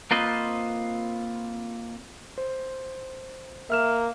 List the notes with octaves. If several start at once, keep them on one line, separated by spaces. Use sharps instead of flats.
A#3 C4 F4 B4 C5 D#5
C5
A#3 E5 F6 E7